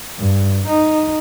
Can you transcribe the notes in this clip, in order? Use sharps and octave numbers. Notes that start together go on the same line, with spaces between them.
G2
D#4